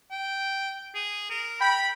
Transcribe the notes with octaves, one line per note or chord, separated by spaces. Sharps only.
G5
G#4
A#4
G5 B5